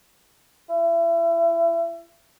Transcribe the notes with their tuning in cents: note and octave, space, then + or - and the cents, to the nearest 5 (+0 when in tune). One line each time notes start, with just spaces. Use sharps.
E4 +30